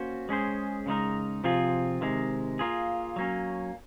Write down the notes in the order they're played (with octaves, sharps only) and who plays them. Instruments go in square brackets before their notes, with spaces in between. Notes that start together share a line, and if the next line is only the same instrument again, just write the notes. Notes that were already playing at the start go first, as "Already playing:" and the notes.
Already playing: [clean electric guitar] A#3 C#4 F#4 C5
G#3 C#4 G#4 C5
C#3 G#3 D#4 A#4
C3 F3 C4 F4 G#4
C3 D#3 G#3
A#3 F4 G#4
F#3 A#3 C#4